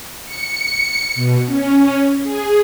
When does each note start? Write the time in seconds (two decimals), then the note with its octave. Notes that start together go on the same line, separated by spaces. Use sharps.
0.25 C#7
1.15 B2
1.47 C#4
2.22 G#4